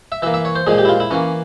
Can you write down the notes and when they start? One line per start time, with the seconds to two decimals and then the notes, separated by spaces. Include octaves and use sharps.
0.12 E5
0.22 E3 E5
0.26 A#3
0.34 E5
0.45 C#5
0.55 C5
0.67 A#2 F3 G#3 G#4
0.78 G4
0.85 E4
0.89 F4
1.00 E4
1.11 E3 A#3 C#4